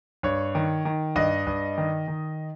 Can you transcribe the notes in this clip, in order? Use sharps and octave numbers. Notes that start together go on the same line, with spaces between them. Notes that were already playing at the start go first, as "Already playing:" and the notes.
G2 C#5
D#3
D#3
G2 D#5
G2
D#3
D#3